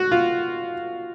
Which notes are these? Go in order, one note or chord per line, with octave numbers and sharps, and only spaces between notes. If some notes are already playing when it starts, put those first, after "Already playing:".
Already playing: F#4
F4